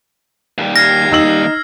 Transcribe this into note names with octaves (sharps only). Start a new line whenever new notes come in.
D#2 G3
F6 G#6 A#6 C7
D#4 E6 F#7